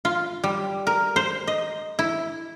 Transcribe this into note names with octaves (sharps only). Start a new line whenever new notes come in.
F4
G3
A#4
C5
D#5
E4